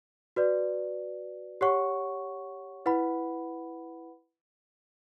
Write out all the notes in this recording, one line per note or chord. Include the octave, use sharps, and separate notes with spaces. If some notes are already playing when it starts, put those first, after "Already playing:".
F#4 B4 D5
G4 C#5 F#5 C#6
E4 B4 F#5 B5